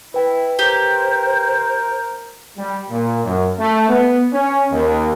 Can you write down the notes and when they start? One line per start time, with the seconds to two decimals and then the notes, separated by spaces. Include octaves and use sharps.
0.14 E4 B4 G5
0.59 G4 A#4 C5
2.58 G3
2.90 A#2
3.24 F#2
3.58 A3
3.89 B3
4.32 C#4
4.71 D#2